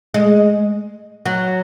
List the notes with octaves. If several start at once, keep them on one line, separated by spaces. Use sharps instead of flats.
G#3
F#3